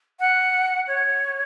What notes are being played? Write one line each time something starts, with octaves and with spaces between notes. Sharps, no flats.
F#5
C#5